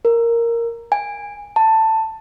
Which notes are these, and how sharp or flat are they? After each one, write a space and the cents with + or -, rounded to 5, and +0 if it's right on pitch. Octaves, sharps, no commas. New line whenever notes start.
A#4 -5
G#5 -20
A5 +10